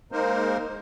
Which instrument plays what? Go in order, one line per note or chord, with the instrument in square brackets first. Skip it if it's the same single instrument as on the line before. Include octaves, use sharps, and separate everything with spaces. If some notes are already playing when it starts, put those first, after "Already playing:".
[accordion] G#3 A#3 D#4 A#4 C5